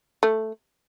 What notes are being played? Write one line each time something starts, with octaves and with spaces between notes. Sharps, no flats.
A3